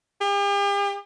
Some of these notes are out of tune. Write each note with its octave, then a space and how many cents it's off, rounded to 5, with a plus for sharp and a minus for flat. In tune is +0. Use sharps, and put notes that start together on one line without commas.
G4 +45